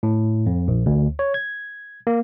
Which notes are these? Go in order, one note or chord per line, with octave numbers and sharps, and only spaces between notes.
A2
F2
A#1
D2
C#5
G#6
A#3